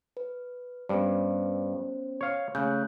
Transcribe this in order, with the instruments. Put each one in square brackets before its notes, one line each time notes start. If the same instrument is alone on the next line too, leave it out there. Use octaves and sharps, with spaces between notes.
[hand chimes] B4
[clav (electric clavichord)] G2 [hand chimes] B3 C#4 C5
[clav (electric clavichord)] C#5 F5
[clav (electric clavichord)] C#3 [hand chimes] A3 F#6 G6